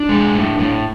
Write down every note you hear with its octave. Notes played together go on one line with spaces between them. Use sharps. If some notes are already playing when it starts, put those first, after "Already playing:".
Already playing: D4
G#3
A2
A2